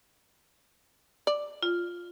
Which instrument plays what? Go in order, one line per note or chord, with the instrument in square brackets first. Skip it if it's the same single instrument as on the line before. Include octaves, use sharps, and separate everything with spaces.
[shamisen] D5
[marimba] F4